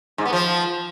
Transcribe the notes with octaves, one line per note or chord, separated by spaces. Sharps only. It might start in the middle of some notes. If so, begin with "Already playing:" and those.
G#2
B3
F3